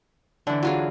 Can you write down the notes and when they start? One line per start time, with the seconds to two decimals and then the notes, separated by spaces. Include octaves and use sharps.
0.47 D3 E3 D4
0.63 F#3 F4 G#4